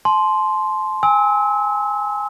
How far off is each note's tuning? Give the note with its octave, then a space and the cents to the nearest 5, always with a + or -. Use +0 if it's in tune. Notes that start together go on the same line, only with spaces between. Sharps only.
A5 -40 C6 +0
G#5 -15 E6 -35